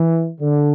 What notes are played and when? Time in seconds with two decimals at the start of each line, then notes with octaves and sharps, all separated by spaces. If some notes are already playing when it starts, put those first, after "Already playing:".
Already playing: E3
0.41 D3